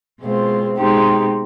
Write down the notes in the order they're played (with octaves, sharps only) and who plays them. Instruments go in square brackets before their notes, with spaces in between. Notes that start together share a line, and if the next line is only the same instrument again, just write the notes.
[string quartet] B2 G#3 C4 F4
B2 G#3 C4 D#4 G4